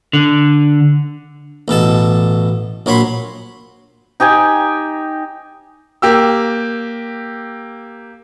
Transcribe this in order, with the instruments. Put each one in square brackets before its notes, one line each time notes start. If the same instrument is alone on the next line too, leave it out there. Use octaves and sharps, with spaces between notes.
[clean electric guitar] D3
[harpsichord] A1 B2 A4 A5
A#1 F#3 C#5 B5 C6
[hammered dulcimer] D#4 G4 G5 G#5
[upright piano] A#3 G4 E6